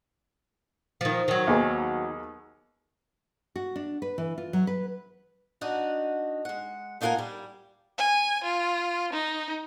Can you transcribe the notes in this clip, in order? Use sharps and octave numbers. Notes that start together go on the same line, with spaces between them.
D#3 F3
D#3 F#3
D#2 B3 G#4
F#4
D4
B4
E3
F4
F#3
B4
D4 D#4 F#4 D#5 F#5
G#3 F#5
A3 D#4 F4 A#4 F#5 G#5
G3
G#5
F4
D#4